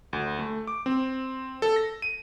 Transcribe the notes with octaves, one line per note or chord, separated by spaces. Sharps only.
D2
A3
D6
C4
A4
A#6
D#7